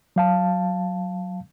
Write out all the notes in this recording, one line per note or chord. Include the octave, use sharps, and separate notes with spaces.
F#3 F5 A5